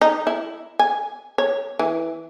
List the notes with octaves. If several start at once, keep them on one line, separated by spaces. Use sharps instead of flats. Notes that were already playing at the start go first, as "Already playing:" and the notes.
D#4
E4
G#5
C#5
E3